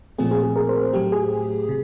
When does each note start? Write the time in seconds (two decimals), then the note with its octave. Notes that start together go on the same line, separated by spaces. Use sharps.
0.18 A#2 F3 A3 C4 G#4
0.31 G#4
0.43 G#4
0.56 A#4
0.69 C5
0.93 A2 F#3 A3 G4
1.12 G#4
1.69 C3